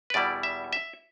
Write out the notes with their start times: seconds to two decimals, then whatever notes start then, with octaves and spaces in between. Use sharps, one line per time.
0.10 B4
0.14 E2 B2 G3 E4 D5
0.43 E5
0.73 E5